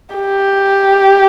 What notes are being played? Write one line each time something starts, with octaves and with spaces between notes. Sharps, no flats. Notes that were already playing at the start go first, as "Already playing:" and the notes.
G4